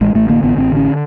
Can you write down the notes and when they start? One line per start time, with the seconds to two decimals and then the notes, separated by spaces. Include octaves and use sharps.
0.01 A1 G#3
0.14 A1 A3
0.28 D3 A#3
0.44 A1 B3
0.57 A1 C4
0.71 D3
0.77 C#4